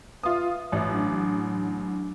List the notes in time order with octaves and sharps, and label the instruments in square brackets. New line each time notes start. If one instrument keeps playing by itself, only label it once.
[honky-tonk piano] F4 D#6 [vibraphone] B4 E5
[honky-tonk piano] A1
[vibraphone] F#3 D4